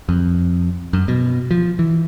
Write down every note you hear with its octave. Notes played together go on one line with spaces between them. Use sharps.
F2
F#2
B2
F3
E3